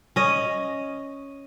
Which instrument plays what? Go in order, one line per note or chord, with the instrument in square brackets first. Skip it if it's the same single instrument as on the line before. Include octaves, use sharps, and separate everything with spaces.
[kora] C#4 D#5